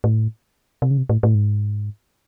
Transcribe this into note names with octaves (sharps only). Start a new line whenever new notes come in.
A2
C3
C#3
C3
A2
A2
G#2